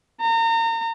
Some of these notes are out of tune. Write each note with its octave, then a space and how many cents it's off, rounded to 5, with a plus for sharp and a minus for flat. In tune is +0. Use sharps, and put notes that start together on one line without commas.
A#5 -35